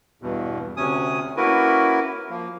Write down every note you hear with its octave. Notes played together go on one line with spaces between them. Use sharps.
E2 G2 B2
D2 C3 C#4 G#5 D#6
A#3 C#4 E4 F#4 A#4 B4
F3 A#3